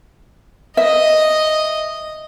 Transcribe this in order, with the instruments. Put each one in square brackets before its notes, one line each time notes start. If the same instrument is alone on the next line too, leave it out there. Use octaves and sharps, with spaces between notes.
[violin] D#5 [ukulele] E5